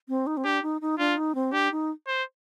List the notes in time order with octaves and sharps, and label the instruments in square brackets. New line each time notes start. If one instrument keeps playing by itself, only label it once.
[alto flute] C4
D#4
C4
[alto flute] D4 [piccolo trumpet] G4
[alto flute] D#4
D#4
[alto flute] D4 [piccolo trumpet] F4
[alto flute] D#4
C4
[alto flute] D4 [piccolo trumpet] G4
[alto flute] D#4
[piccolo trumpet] C5